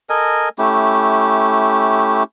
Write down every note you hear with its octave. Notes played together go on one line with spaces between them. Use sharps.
A4 A#4 D#5 G#5
A3 C#4 E4 G4